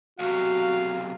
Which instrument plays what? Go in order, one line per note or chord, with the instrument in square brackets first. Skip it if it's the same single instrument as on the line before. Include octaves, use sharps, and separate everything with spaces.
[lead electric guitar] B1 C3 [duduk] F#4 [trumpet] F5